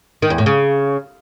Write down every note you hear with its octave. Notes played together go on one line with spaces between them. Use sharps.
D#3
E2
A2
C#3